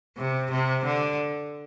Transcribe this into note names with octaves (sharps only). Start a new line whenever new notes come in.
C3
C3
D3